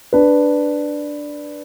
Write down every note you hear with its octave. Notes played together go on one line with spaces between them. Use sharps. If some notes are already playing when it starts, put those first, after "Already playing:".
D4 B4